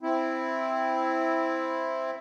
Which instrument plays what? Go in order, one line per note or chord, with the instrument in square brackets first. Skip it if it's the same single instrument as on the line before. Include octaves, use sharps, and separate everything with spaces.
[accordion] C4 E4